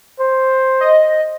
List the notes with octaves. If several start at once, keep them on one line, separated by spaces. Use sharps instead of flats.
C5
D#5